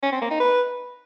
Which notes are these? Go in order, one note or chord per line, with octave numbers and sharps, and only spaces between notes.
C#4
C4
A#3
D#4
B4